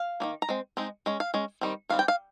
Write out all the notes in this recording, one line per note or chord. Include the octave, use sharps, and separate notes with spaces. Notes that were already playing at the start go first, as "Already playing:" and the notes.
Already playing: F5
D#3 G3 A#3
A#5
G#3 C4
G#3 C4 D#4
G#3 C#4
F5
G#3 C#4
D#3 G3 C4
D#3 G3 C4 F5
G5
F5